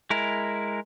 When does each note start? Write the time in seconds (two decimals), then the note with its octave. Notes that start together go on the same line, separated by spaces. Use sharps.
0.10 G#3 E4 A#4